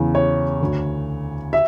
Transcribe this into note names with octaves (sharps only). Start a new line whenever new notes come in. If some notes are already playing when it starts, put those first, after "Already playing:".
Already playing: E2 C#3 E3
C#5
D2 D3
E5